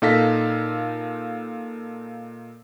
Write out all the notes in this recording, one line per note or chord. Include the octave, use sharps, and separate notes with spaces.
A#2 D#4 A4 F5 A#6 B6